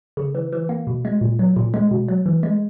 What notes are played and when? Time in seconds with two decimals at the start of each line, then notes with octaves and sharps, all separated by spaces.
0.17 C#3
0.35 E3
0.52 E3
0.69 A#3
0.87 B2
1.05 G#3
1.21 A#2
1.39 F#3
1.56 A#2
1.74 G#3
1.91 B2
2.08 F#3
2.26 E3
2.43 G#3